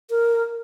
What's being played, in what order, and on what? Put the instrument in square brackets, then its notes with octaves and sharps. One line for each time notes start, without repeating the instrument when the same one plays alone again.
[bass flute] A#4